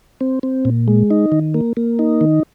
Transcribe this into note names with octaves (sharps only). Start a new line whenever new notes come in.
C4
C4
A#2
G#3
D#4
D#3
A#3
A#3
D#4
D#3